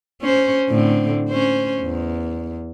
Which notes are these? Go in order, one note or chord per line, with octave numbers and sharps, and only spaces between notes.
C#4 C5
A2 D3 C4
C#4 C5
E2